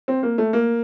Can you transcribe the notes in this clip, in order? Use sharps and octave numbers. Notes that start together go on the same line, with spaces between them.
C4
A#3
A3
A#3